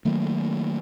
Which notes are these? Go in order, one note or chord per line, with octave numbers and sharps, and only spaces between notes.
D#3 F#3 A3 A#3